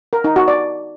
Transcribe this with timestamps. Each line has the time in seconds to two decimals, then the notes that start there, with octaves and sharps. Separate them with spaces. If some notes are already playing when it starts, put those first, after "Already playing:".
0.13 A#4
0.24 D#4
0.36 F#4
0.48 D5